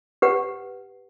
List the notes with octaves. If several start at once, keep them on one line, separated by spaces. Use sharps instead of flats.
G4 B4 F#5